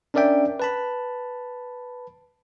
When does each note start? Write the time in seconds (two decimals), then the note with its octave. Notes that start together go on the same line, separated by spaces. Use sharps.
0.14 C#4 D4 A#4 D5 E5 G5
0.60 B4 A5 B5